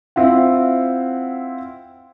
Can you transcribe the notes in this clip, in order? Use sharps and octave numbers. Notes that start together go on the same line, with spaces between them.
C4 E4 F4 F#5